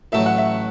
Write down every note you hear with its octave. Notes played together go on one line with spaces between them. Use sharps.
A1 A2 F#3 A3 E5
F#5
E5